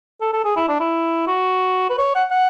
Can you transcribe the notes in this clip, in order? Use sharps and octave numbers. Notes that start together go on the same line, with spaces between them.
A4
A4
G#4
E4
D4
E4
F#4
B4
C#5
F#5
F#5